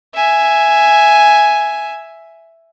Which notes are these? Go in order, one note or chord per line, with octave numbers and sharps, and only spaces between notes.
E5 G#5